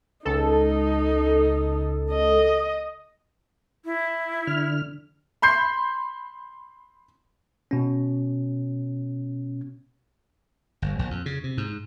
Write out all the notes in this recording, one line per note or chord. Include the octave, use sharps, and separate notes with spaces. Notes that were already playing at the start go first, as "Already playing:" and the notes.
C#2 D#4 A4
D#5
E4
D3 F6
B5 C6 G6 C7
B2 C#4
G1
A#1
F2
C#3
C3
G#2